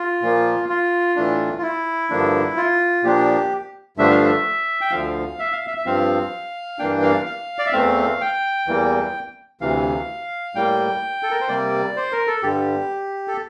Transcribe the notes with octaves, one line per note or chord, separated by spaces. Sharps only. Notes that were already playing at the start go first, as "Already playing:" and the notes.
Already playing: F4
A#2 F3 A#3
F4
A2 E3 A3 D4
F4
E4
G2 D3 F3 A#3 D4
F4
A#2 F3 A#3 D4 G4
G2 D3 F3 A3 D4 E5
F5
E5
G5
D2 D3 F3 F5
E5
F5
E5
E5
G2 F3 C4 F5
G2 E3 A#3 D4 G5
F5
F5
D5
E5
E2 E3 A3 C4 F5
G5
E2 E3 G3 A#3
D2 C3 E3 F5
A2 G3 A#3 G5
A4
A#4
C5
C3 G3 A#3 D5
C5
A#4
A4
G2 D3 G3 G4
A4